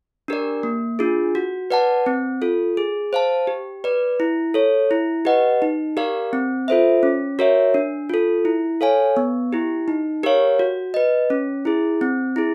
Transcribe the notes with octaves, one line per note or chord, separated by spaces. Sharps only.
D4 G4 A#4 D5
A#3
D4 F4 G#4
F#4
B4 D5 F#5 A5
C4
F4 A4
G#4
C5 F5 A5
G4
B4 D5
E4
A4 C#5
E4
G4 B4 D#5 F#5
D#4
G4 A#4 D5 F5
C4
F4 A4 C5 E5
C#4
F#4 A#4 C#5 E5
D4
F4 A4
E4
A4 C#5 F5 G#5
B3
E4 G4
D#4
G4 A#4 C#5 F5
F#4
B4 D#5
C#4
E4 G#4
C4
E4 G#4